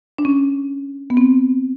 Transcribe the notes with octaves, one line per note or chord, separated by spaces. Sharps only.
D4
C#4
B3
C4